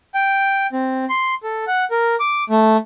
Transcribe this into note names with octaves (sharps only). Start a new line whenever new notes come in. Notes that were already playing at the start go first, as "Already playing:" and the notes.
G5
C4
C6
A4
F#5
A#4
D6
A3